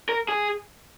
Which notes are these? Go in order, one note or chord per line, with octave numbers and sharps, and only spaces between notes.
A#4
G#4